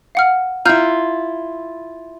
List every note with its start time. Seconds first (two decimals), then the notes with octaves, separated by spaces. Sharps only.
0.15 F5 F#5 F6
0.65 E4 F4 A#5 F6 G6